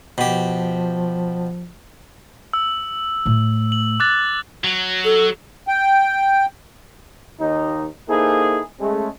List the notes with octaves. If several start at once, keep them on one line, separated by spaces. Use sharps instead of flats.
B2 F3 G4
E6
A2 A3
F#7
D6 F#6 A6
F#3
A4
G5
D#2 D#4
A#3 D#4 E4 G#4 A4 C5
G#3 A3 C#4